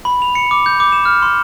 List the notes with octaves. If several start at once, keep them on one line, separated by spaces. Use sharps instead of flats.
B5
F7
C#7
D6
G6
D6
E7
F6
C6